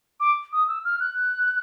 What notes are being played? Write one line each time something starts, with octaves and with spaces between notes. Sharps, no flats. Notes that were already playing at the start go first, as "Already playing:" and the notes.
D6
D#6
E6
F6
F#6